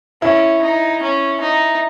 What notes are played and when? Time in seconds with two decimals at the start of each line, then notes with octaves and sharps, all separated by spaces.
0.22 C#4 E4
0.63 D#4
1.02 C#4
1.41 D#4